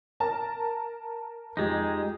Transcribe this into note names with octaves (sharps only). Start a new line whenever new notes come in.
A#4 A5 A#5
F2 G#3 D#4 G4 G#6